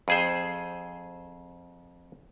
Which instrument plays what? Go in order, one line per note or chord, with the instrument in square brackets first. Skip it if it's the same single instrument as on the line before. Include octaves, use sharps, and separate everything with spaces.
[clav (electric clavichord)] F2 G#4 C5